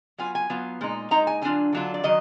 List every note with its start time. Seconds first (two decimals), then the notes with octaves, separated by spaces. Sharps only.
0.18 F#3 B3 F4 G#5
0.35 G#5
0.50 F#3 B3 F4
0.81 A#2 G#3 D#4
1.11 A#2 G#3 D#4 A#5
1.27 G#5
1.42 D3 F#3 D4 F4 G#5
1.73 D3 F#3 D4 F4
1.94 D5
2.03 D#3 F#3 D#5